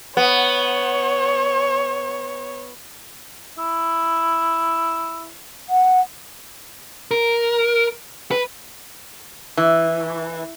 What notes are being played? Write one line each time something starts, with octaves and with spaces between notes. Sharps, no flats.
B3 C#5
E4
F#5
A#4
B4
E3